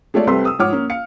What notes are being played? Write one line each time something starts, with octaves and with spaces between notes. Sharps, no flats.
G#3 A3 F4 C#5 D5
C2 C3 C4 A4 B4 C6
D#6 E6
G#2 F3 C#5 F#5 D6 F6
A#3 C#4
F5 C#7